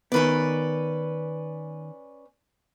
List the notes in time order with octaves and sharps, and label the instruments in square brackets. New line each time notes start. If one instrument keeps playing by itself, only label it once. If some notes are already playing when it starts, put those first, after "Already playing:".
[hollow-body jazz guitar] D#3 B3 [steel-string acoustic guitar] C#4 B4 D5